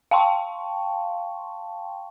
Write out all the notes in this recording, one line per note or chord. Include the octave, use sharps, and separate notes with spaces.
F5 G5 A5 C6 C#6